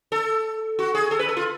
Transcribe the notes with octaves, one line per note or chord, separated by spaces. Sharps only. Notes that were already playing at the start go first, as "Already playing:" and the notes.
A4
F#4
G#4
A4
B4
A4
F4